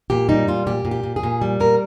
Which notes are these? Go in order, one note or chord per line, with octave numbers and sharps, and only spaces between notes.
A#2 G4
G3 D#4
A#2 F4
A#2 G4
A#2
G4
A#2
G#4
A#2
G3
A#2 A#4